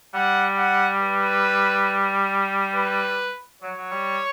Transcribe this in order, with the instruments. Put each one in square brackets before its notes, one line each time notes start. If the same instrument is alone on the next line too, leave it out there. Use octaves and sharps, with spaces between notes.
[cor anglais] G3 [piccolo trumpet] F#5
[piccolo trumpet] F#5
B4
B4
[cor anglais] F#3 [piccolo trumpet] C#5
[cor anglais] F#3
G3